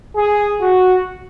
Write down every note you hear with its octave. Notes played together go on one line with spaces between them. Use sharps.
G#4
F#4